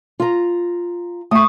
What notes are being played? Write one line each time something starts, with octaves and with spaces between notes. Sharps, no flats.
F4 A#5
A3 C#6 D#6